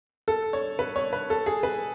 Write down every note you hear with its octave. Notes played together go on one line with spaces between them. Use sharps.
A4
C#5
B4
C#5
B4
A4
G#4
B4